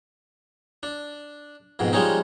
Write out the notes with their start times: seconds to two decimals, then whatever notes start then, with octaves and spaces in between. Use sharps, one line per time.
0.83 D4
1.79 F2 G#2 B2
1.93 F3 G3 G#3 C#4 D#4